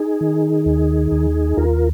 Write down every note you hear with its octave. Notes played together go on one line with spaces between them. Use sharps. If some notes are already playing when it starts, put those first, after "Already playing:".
Already playing: D#4 G#4
D#3
D#2
D#2
D#2 F4 A#4